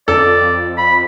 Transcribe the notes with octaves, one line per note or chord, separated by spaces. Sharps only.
F2 A4 D5
B5